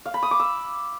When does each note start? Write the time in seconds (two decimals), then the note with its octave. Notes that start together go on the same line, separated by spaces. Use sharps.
0.06 F5
0.14 B5
0.23 D#6
0.31 D6
0.40 E6